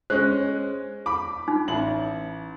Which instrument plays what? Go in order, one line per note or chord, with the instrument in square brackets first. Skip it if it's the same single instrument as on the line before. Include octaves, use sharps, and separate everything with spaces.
[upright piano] G#3 C#4 [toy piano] C5
[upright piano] B5 D6
[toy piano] D#4
[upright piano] A1 F#7